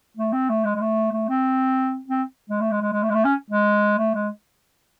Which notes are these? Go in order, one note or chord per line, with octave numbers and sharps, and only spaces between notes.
A3
C4
A3
G#3
G#3
A3
A3
C4
C4
G#3
A3
G#3
G#3
G#3
A3
G#3
A3
C#4
G#3
A3
G#3